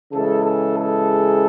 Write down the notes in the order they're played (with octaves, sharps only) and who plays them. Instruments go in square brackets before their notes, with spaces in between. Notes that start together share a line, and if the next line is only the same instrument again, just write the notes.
[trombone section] C#3 E3 G#3 A4
A4
A4